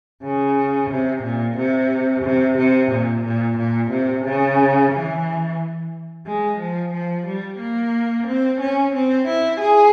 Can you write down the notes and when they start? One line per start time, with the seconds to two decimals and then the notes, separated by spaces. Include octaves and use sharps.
0.23 C#3
0.90 C3
1.23 A#2
1.56 C3
2.24 C3
2.57 C3
2.91 A#2
3.25 A#2
3.57 A#2
3.91 C3
4.25 C#3
4.92 E3
6.26 G#3
6.60 F3
6.93 F3
7.26 G3
7.60 A#3
8.27 C4
8.60 C#4
8.94 C4
9.28 E4
9.60 G#4